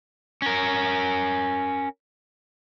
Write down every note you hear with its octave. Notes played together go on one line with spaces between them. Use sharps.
C#4 A#4